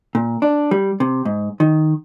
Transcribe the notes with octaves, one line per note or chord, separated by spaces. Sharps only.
A#2
D4
G3
C3
G#2
D#3